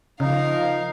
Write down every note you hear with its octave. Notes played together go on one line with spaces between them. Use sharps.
C#3 F3 D#4 A#4 F5